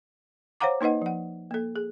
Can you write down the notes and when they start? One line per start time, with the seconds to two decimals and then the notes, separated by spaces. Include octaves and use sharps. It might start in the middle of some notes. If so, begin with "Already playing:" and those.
0.61 C5 C#5 F5 F#5 A#5 D6
0.81 A#3 D#4 B4 D#5 F#5
1.02 F3 F#5
1.51 A#3 A4
1.76 G#4